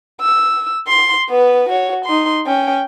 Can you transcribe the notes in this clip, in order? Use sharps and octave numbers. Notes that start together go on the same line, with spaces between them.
E6
C6
B3 B4
F#4 C#5
D#4 C6
C#4 G5